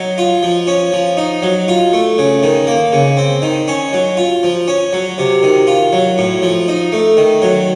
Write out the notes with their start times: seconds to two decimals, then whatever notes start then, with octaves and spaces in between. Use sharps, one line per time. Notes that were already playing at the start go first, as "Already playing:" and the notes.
Already playing: F#3 D#4
0.18 F4
0.43 F3
0.67 C#4
0.92 F3
1.17 D#4
1.42 F#3
1.68 F4
1.93 A3
2.18 C#3
2.43 D#3
2.67 A#3
2.92 C#3
3.17 C4
3.42 D#3
3.68 C#4
3.93 F#3
4.17 F4
4.43 F3
4.68 C#4
4.93 F#3
5.18 C3
5.43 D#3
5.67 F4
5.92 F#3
6.18 A2
6.42 F3
6.68 D#4
6.92 A3
7.17 D#3
7.42 F#3